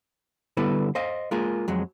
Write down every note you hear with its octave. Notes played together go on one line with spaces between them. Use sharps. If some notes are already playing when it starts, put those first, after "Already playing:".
D3 G3 B3 E4 A4 B4
C5 D#5 F5
G#3 A#3 F4 G#4
F2 F#3 G#3